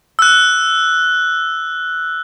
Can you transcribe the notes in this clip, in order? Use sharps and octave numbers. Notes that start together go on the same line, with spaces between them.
E6 F#6